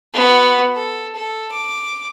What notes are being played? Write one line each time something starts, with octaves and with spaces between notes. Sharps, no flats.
B3 F#4
A4
A4
D6